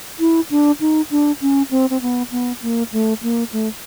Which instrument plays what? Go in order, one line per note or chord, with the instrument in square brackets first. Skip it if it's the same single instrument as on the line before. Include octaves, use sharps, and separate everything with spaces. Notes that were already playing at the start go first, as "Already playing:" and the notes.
[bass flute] E4
D4
D#4
D4
C#4
C4
C4
B3
B3
A#3
A3
A#3
A3